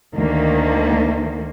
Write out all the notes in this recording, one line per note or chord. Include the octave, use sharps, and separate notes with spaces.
D2 D#3 A#3